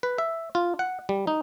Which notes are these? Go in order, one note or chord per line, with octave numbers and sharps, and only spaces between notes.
B4
E5
F4
F#5
G3
D#4